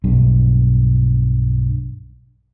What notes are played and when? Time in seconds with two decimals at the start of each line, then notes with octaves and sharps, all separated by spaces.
0.04 B1 G2